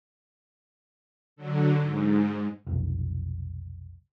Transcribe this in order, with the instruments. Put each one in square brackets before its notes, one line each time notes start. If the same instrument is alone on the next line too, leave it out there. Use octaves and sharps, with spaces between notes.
[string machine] D3 F#3
G#2
[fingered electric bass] F1 B1